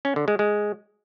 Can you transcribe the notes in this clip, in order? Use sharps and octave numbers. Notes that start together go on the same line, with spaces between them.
C#4
D3
G#3
G#3